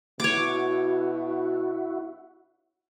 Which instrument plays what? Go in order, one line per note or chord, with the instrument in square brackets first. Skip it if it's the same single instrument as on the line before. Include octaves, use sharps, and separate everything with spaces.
[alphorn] B2 [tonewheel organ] E4 F#4 [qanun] C#5 D6